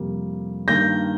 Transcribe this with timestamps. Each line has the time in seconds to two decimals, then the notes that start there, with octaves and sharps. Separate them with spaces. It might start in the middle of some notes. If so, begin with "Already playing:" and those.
Already playing: F2 C3 G3 A#3
0.67 G2 D#3 A#3 G6 A#6